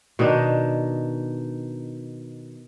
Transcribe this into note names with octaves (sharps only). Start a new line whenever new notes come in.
B2 D#3 D4 D#4